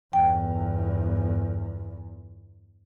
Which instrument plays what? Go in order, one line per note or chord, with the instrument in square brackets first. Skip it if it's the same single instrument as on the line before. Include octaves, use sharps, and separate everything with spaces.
[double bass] G1 E2 [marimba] G5